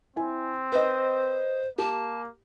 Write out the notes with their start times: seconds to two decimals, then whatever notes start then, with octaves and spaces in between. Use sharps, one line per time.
0.16 C4 E4 G#5
0.72 B4 C5 D#5
1.78 A#3 G4 A5